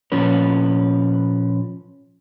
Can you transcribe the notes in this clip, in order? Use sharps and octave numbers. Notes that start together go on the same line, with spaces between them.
A#2 F3 C#4 B4